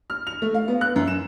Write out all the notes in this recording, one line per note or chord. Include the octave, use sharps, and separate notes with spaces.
F6
F7
A3
F5
B3
F#6
F#2
E7